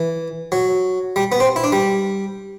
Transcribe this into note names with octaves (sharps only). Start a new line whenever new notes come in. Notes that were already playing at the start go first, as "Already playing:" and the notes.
Already playing: E3
F#3
G3
B3
C4
E4
D4
G3